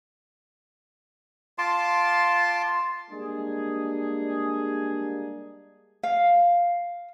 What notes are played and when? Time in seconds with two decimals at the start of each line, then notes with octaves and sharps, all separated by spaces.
1.58 F4 A5 C6 D6
3.10 G3 G#3 A#3 D4 G#4
6.03 F5